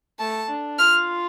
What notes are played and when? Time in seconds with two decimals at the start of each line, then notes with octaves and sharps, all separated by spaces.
0.20 A3 A5
0.50 D4
0.79 F4 F6